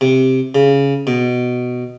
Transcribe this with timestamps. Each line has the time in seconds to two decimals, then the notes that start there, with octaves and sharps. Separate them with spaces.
0.01 C3
0.55 C#3
1.07 B2